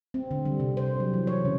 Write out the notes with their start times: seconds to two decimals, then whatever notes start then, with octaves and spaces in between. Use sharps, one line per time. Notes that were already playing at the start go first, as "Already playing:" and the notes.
0.14 C4
0.31 D3
0.45 G3
0.60 C3
0.77 C5
1.00 F#3
1.14 E3
1.27 C#5
1.45 C#3